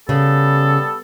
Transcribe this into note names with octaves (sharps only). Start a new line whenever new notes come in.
C#3 G3 B3 A4